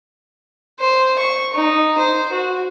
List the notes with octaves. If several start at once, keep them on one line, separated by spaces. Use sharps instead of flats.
C5
C#6
D#4
C5
F#4